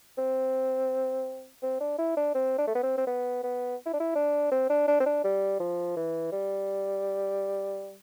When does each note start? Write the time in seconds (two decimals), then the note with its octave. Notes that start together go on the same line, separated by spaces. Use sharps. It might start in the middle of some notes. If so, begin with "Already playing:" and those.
0.18 C4
1.62 C4
1.80 D4
1.98 E4
2.17 D4
2.35 C4
2.58 D4
2.67 A3
2.75 B3
2.83 C4
2.97 C4
3.07 B3
3.43 B3
3.86 E4
3.94 D4
4.00 E4
4.15 D4
4.51 C4
4.70 D4
4.88 D4
5.00 C4
5.06 D4
5.24 G3
5.60 F3
5.97 E3
6.32 G3